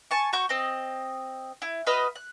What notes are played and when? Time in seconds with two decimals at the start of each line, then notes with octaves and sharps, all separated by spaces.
0.11 G#5 A5 C#6
0.33 F#4 C#6 G6
0.49 C4 D#5
1.62 E4
1.87 F#4 B4 D#5 F6
2.16 F#6